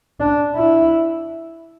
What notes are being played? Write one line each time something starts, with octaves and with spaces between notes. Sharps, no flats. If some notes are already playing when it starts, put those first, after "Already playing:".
D4
E4